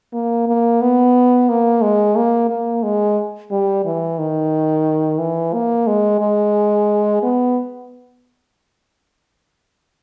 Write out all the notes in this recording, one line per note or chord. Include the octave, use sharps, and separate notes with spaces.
A#3
A#3
B3
A#3
G#3
A#3
A#3
G#3
G3
E3
D#3
E3
A#3
G#3
G#3
B3